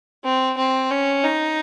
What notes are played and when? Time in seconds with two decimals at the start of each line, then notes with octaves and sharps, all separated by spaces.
0.24 C4
0.57 C4
0.91 C#4
1.24 D#4